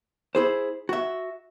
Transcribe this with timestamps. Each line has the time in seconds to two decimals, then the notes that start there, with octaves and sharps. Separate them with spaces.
0.35 E4 G#4 C5
0.89 F#4 E5